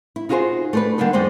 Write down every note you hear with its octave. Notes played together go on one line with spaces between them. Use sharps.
E4
D#4 F4 F#4 G#4 A4 C5
A3 D4 B4
D3 G3 A#3 B3 D#4
F2 G3 G#3 B3 D#4 C5